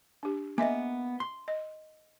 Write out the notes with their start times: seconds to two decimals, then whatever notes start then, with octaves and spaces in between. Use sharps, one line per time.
0.23 D4 G4
0.58 A#3 B3 D#5 E5 G#5
1.20 C6
1.48 D#5